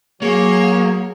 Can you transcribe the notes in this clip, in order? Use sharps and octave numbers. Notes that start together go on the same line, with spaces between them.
F#3 A#3 G#4 C#5